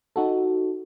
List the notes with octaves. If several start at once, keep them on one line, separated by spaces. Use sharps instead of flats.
D#4 F#4 A4